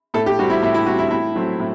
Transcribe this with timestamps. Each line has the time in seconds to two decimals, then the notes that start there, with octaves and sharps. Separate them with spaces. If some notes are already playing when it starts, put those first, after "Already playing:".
0.14 A2 A4
0.26 G4
0.39 G3 C4 F#4
0.50 E4
0.63 A2 E4
0.74 E4
0.87 G3 C4 F#4
0.98 E4
1.11 A2 E4
1.36 F#3 A3 C4
1.59 A2